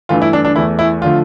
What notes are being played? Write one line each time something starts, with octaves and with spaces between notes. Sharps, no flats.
G2 E3 A3 F4
E4
D4
D4
E2 E3 A3 E4
E4
D3 F3 A3 F4